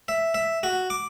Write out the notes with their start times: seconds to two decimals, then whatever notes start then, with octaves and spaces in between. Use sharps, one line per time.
0.08 E5
0.34 E5
0.63 F#4
0.90 D6